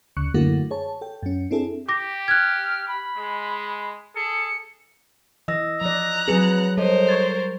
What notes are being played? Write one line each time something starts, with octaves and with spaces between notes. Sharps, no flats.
D2 C#3 C#6 F#6 C#7
F#2 D3 A3 A#3 E4 F#4
G#4 C#5 A5
A4 G5
F#2 C#4
C4 D4 E4 G#4 A4
G4 D6 A#6
F6 F#6 G#6
B5
G#3
G#4 A4 C#7
E3 D#5 E6 A#6
F3 D5 A#5 F#6
F#3 C4 G#4 B4 C#7
G3 A4 A#4 C5 C#5 D#5
C#6 G#6 A6